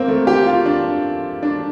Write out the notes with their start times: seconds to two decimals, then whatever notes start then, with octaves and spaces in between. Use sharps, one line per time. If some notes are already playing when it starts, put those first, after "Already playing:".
Already playing: A#3 C4
0.08 A3
0.27 G4
0.46 F4
0.66 D4
1.43 D4